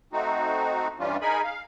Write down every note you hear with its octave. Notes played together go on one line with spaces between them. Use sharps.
A3 C4 D#4 F#4
G2 E3 G3 C#4 D4 F4
D#4 G#4 A#4 G#5 B5
F5